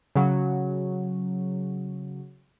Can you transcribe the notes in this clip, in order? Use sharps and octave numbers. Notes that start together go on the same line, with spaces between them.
C#3 F#3